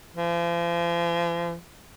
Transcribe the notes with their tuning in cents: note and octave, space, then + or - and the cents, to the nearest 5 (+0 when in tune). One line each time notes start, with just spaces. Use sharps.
F3 -40